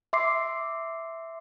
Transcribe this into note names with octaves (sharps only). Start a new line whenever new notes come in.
E5 C6 D6 C7